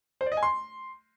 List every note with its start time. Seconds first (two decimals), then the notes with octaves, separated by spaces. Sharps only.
0.21 C5
0.26 D5
0.32 D#5
0.37 G#5
0.43 C6